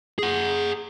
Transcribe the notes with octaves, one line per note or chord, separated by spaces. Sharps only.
G#4 F#5